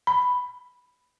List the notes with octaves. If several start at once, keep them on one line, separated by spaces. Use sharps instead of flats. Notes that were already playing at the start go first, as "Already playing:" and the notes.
B5